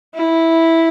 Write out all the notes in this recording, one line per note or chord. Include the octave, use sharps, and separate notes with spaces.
E4